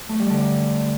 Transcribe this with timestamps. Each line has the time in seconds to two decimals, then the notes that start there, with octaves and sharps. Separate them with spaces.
0.09 A3
0.19 G3
0.30 D3